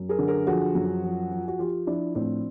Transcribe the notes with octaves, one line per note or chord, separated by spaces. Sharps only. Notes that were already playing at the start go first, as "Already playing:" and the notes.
Already playing: F#2
G#4 A#4
D3
G#4 A#4
F3 F#4 G#4
F#2
F3
F3
F#4
F3 F4 G4
F3 D4 E4
A2 C4 D4